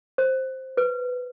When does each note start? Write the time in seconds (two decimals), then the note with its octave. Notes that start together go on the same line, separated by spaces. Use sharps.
0.18 C5
0.77 B4